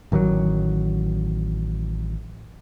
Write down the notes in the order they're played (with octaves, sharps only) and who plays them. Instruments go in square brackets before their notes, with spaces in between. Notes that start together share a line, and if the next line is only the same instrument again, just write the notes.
[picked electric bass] A1 D#3 F3 F#3